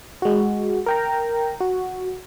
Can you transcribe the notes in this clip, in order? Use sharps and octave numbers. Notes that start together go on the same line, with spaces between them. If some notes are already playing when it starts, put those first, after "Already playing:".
G#3 F#4
A#4 G5 A#5
F#4